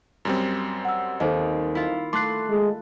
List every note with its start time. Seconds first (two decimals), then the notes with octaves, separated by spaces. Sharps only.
0.25 F#2 G3 C4
0.85 F#5 E6
1.20 D#2 A4 C5 D#5
1.75 E4 F4
2.13 A3 C6 D6 F#6 C7
2.49 G#3